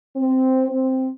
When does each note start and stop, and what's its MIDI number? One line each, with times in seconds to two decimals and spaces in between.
0.16 0.69 60
0.69 1.08 60